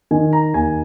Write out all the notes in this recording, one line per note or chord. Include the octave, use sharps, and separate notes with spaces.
D#3 G#5
A#5
D#2 G#5